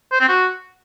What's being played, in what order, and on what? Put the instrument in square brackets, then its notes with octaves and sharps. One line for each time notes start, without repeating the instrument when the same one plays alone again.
[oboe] C5
C4
F#4